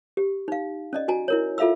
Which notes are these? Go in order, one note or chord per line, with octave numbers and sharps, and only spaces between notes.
G4
D#4 F5
C#4 D5 D#5
F#4 G#5 A#5
E4 A#4 C#5
F4 A4 E5 F5 B5 E6